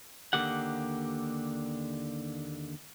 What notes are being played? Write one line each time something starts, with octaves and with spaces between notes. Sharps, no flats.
D#2 D3 G3 A#3 G4 F#5